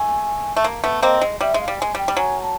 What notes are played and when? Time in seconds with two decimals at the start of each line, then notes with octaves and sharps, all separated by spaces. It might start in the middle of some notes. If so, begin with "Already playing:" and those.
Already playing: A3 G#5
0.56 A3
0.64 A#3
0.84 A3 B3
1.02 A#3 C4 D#5
1.21 G#3
1.40 G3 E5
1.54 G#3
1.60 F5
1.68 G3
1.79 G#3 G#5
1.95 G3 G5
2.08 G3
2.17 F#3 G#5
2.41 A5